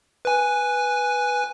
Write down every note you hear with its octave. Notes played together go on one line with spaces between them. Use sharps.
B4 G#5